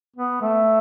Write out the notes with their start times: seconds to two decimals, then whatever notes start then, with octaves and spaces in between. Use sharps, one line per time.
0.16 B3
0.42 A3